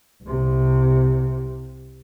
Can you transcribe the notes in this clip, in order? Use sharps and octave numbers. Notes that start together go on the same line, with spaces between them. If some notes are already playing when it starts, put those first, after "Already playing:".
C2 C3